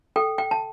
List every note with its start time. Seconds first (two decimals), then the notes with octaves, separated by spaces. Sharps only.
0.16 A4 G5
0.38 G5
0.51 A5